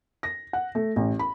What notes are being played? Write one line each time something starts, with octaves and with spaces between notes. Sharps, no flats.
A#6
F#5
A3
A1
B5